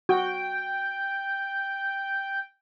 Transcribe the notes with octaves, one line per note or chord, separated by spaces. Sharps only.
F#4 G5